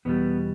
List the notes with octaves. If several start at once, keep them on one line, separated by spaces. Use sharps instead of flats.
E2 B2 G3 B3